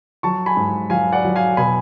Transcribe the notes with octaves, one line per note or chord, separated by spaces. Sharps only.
F#3 A5 C#6
G#5 B5
G#2
F#3 F5 G#5
D5 F#5
F#3
F5 G#5
B2 G#5 B5